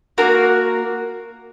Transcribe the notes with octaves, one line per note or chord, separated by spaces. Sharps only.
A#3 D4 F#4 A#4